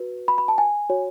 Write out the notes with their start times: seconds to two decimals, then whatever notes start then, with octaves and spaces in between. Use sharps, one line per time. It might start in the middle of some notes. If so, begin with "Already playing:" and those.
Already playing: F#4 B4
0.28 B5
0.38 B5
0.48 A5
0.58 G#5
0.90 F#4 C#5